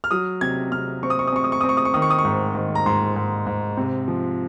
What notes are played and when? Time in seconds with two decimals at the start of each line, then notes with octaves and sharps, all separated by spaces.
0.04 F6
0.11 F#3 D#6
0.41 C3 G#6
0.72 C3 F6
1.03 C4 C#6
1.10 D#6
1.19 C#6
1.28 D#6
1.32 C4 C#6
1.44 D#6
1.52 C#6
1.61 C4 D#6
1.69 C#6
1.77 D#6
1.85 C#6
1.94 D#3 D#6
2.02 C#6
2.10 D#6
2.19 C#6
2.25 G#2
2.55 D#3
2.75 A#5
2.86 G#2 C6
3.16 G#2
3.47 G#2
3.77 C3
4.08 F3